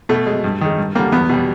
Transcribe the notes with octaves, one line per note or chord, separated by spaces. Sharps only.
B2 A3
G#3
G2
D#3 G#3
G2
D3 G3 A#3
E2 B3
B2 G3